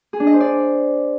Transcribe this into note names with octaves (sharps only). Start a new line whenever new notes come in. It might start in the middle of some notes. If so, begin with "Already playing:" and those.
G#4
D4
D#5
C5
D5